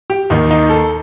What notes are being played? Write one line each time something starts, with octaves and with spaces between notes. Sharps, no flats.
G4
D#2 D#3 D#4
D#4
A4